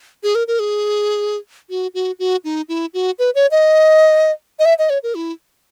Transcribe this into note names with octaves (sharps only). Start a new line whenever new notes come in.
G#4
A#4
A#4
G#4
F#4
F#4
F#4
D#4
E4
F#4
B4
C#5
D#5
D#5
E5
D#5
C#5
A#4
E4